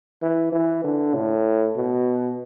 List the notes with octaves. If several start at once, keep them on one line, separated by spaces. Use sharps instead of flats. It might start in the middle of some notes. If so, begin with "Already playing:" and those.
E3
E3
D3
A2
B2